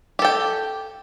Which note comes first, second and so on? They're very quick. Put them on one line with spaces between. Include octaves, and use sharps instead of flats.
G4 A4 G5